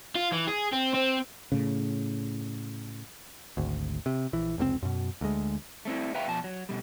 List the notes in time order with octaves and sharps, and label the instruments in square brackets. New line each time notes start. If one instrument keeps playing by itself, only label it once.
[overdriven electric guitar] F4
E3
G#4
C4
C4
[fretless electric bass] A2 C#3
[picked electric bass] G#1 D2
C3
A#1 E3
F1 C#2 C3 C4
F#2 B2
D2 G#3
[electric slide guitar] A3 C4 E4
B4 E5 F5 G5 A#5
B2 F3 A5
F#3
B2 G3